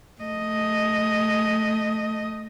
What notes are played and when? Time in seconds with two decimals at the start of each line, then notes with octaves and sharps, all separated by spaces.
0.21 A3 D#5